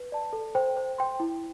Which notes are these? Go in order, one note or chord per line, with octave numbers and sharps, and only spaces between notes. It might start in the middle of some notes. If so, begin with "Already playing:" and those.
Already playing: B4
D5 A5
A4
C5 G5
C5
G5 C6
E4